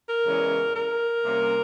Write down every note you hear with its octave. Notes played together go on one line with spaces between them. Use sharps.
A#4
E2 C#3 E3 G#3 C#4
A#4
C3 G3 A#3 C#4